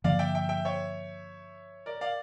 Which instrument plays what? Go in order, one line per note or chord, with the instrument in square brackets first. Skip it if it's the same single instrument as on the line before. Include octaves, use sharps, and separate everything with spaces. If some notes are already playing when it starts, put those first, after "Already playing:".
[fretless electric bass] G2 D3 F3 A#3 [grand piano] D5 F5
[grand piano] E5 G5
E5 G5
E5 G5
C#5 E5
A#4 D5
D5 F5